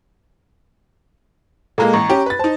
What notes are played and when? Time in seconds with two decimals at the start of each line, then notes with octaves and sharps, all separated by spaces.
1.78 A#2 G#3 A#3 A4 F5 A#5
1.93 A1 A#5 C#6
2.10 C#4 G4
2.26 B4 A6
2.39 D#4 C5 A5